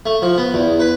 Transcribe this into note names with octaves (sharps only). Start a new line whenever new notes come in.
A3
F3
B3
E2
B4